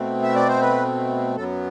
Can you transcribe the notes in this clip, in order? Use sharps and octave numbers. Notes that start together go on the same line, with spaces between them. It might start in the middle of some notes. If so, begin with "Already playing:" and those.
Already playing: B2 A3 C4
E5
D5
C5
B4
F#2 F#3 B3 A4